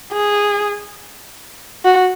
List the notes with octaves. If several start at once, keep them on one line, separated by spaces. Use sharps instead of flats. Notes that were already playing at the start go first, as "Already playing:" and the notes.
G#4
F#4